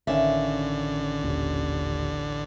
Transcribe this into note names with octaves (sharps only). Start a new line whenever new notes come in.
A1 D3 D#3 C#4 D5 E5 F5
D#1